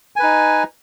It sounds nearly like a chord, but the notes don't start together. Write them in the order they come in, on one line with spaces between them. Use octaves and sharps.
G#5 B4 D#4